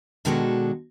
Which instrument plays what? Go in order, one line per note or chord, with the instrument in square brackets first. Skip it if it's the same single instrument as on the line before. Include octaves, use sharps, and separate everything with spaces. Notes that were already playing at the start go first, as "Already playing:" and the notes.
[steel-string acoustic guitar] B2 D#3 G#3 D4 F#4 A4